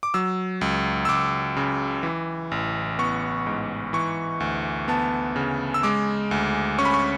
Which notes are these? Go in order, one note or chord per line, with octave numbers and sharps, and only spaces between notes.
D6
F#3 E6
C#2
E6
C#2 D6
C#3
E3
A1
B3 C#6
G#2
E3 C#6
D2
B3 A5
C#3
E6
G#3 D6
D2
C#4 C#6
B5
C#6